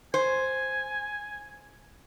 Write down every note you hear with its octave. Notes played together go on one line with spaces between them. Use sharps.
C5 G#5